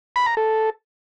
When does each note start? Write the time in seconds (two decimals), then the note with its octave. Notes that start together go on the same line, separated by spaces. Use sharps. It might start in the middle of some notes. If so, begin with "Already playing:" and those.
0.16 B5
0.26 A#5
0.37 A4